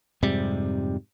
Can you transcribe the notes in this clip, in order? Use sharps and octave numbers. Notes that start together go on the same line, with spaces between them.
F2 G#2 C3 G3